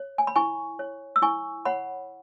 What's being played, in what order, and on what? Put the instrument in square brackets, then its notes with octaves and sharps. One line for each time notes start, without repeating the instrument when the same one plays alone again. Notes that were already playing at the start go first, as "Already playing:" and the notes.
Already playing: [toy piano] C#5
G#5
B5
E4 G#5 C#6
C#5
E6
E4 G#5 C#6
C#5 F#5 B5